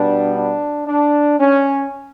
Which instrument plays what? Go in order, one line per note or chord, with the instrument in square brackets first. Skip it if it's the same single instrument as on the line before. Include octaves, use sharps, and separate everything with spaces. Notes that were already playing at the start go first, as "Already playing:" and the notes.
Already playing: [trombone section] B2 G3 B3 D4
D4
D4
C#4